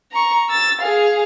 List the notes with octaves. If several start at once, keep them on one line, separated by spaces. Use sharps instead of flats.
A#5 C#6
E6 A6
G#4 F5